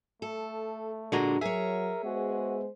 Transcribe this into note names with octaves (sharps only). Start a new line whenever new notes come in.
A3 A4
A#2 D3 G#3 D4 F#4 A#5
F#3 G#4 A#4 C#5 E5
G#3 B3 F#4 C5